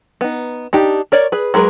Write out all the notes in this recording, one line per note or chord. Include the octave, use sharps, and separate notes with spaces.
B3 D#4
D4 D#4 G4
A#4 C#5 D5
G#4 B4
F#3 G#3 G#4 A#4 B4